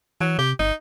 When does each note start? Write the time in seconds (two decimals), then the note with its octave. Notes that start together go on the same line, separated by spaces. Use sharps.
0.21 E3 F#3
0.38 C3 G4
0.59 G1 D#4